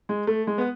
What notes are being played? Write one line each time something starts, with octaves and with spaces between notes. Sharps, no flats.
G#3
A3
G#3
B3